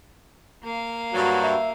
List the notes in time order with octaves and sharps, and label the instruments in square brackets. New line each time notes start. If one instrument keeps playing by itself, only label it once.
[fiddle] A#3 F5
[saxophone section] G2 F#3 [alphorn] F#4
[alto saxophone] E5